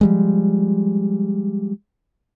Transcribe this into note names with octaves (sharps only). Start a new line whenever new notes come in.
F3 G3 G#3